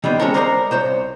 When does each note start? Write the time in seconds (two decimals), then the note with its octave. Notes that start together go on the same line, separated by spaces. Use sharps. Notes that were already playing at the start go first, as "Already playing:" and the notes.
0.04 D#3 G3 B3 C4
0.20 G#3 C#4 A4 A#4
0.34 A#4 C5 D5 D#5 F5 A#5
0.71 C2 C5 C#5